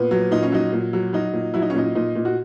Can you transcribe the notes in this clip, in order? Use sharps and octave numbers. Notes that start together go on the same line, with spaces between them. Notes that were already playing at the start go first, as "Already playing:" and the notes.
Already playing: A#2 B3
F#3
A#2 D#4
C#4
F#3 D#4
A#2
F#3
F#3 D#4
A#2
F#3 E4
D#4
C#4
A#2 D#4
A#2 D#4
A#2
F#4